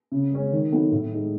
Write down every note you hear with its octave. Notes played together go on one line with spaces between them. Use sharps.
C#3
G#3 C#4
D#3
F#3 B3 D#4 A4
A2
G#3 D#4 G#4